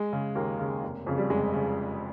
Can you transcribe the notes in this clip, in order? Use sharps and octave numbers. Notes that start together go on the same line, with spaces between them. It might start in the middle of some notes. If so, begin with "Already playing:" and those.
Already playing: G#3
C#3
D#2 A#3
C#3
F1
F2 C#3
G3
F1 G#3
C#3